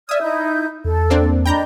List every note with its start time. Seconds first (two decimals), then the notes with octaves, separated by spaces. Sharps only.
0.09 D5 E5 D#6 F6 G#6
0.21 D#4 E4 G6
0.84 E2 A4
1.10 A#3 C4 D4
1.46 D4 D#5 G5 A#5 B5 G6